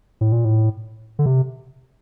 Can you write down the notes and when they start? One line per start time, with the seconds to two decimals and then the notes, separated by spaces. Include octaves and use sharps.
0.21 A2
0.32 A#2
0.45 A2
1.19 D3
1.26 C3